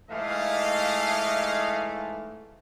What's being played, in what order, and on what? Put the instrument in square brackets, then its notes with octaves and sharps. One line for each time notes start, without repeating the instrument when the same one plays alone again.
[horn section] G#2 E3 A3 [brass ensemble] D#5 F5